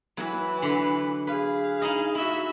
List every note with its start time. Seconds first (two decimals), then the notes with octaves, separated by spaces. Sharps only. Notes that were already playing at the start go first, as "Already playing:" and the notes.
0.17 E3 F#3 B4
0.62 D3 B5
1.27 G#4 B4 F5
1.82 D#4 E4 D#5
2.15 E4 F#4 E5